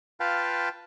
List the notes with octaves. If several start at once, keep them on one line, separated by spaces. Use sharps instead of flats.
F4 B4 F5 G5 A5